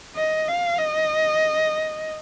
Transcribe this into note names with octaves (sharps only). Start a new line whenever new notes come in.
D#5
F5
D#5